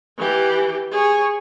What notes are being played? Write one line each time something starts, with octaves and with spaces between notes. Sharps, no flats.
E3 G4
G#4 C#5